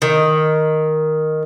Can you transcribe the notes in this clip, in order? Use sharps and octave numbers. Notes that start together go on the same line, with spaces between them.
D#3